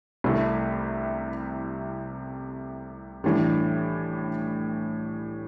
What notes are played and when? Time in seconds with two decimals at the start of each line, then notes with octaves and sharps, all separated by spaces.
0.24 C2 C3 A3 E4
3.24 A2 E3 G3 D4